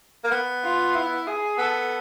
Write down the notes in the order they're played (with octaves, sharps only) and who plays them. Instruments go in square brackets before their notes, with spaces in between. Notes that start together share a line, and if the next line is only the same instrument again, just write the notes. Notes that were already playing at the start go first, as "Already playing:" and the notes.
[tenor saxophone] A#3
B3
[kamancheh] F4
E4
G#4
[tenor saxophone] B3 [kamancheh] A4